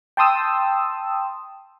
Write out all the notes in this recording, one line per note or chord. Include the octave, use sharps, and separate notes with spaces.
G5 A5 C6 D#6 E6